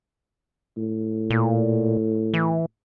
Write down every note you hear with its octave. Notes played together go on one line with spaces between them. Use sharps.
A2
A#2
E3